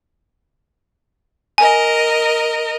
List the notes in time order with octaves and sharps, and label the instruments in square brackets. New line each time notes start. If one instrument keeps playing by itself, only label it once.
[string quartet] A#4 D#5 [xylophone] G#5